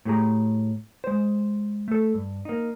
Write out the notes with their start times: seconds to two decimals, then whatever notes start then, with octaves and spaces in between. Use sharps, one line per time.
0.05 A2 A3 G4 G#4 A#5
1.04 G#3 C5
1.88 A3 A4
2.14 G2
2.45 A#3 D#4